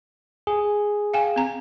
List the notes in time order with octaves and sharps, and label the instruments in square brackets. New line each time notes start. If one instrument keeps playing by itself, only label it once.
[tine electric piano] G#4
[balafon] F5 G5 G#5
C4 A#5